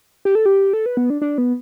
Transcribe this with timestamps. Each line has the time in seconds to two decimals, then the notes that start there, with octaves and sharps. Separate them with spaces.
0.25 G4
0.35 A4
0.46 G4
0.73 A4
0.86 B4
0.97 B3
1.10 D4
1.22 D4
1.38 B3